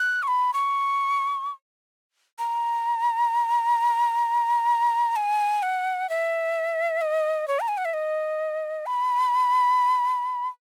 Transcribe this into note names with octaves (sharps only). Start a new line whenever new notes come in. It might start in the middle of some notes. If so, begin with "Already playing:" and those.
Already playing: F#6
C#6
B5
C#6
A#5
G#5
F#5
E5
D#5
C#5
A#5
G#5
F#5
E5
D#5
B5